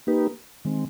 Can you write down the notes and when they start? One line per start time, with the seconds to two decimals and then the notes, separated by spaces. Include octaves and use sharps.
0.07 A#3 D#4 G4 B4
0.65 D#3 G#3 C4